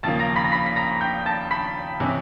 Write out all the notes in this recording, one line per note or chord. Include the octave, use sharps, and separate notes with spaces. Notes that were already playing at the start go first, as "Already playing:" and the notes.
D#2 C#3 F3 A#3 A5 A6
A#5 A#6
B5 B6
A#6
B5 B6
B6
A#5 A#6
G5 G6
A5 A6
B5 B6
C3 E3 G#3 C#4